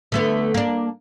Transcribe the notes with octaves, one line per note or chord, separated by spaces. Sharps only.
D3 A3 B3
A#3 D4